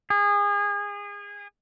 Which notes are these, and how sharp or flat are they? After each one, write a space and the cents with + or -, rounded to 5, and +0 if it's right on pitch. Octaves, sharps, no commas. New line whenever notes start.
G#4 -30